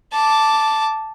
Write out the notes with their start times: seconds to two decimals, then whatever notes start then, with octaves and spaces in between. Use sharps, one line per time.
0.12 A5 D6